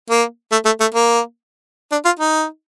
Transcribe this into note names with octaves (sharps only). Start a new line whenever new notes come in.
A#3
A3
A3
A3
A#3
D4
F4
D#4